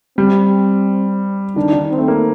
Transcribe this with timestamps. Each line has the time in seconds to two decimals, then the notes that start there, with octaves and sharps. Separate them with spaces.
0.18 G3 C4
1.56 D#3 D4
1.73 D#3
1.91 C4
1.98 A3
2.08 A#3